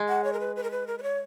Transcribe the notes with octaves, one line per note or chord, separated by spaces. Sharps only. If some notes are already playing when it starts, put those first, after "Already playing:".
Already playing: G#3
F#5
C#5
A#4
B4
B4
A#4
B4
A#4
B4
C#5